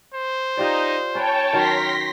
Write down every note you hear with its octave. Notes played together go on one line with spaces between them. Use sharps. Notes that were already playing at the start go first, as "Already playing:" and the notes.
C5
D#4 F4 G4 D5
C#4 B4 C#5 G5 A5
D#3 F#3 A#4 C6 A#6 B6